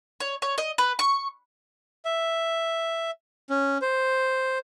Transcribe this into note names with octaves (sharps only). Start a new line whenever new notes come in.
C#5
C#5
D#5
B4
C#6
E5
C#4
C5